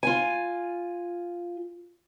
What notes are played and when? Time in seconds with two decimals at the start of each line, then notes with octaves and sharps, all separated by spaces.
0.03 F4 G#5